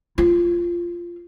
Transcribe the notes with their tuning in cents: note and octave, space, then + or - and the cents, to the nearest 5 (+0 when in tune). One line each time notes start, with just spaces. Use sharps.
F4 -10